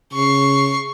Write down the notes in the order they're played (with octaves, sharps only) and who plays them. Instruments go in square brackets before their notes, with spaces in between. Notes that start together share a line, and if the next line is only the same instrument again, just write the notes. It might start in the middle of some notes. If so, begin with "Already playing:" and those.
[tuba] C#3 [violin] C#6 C7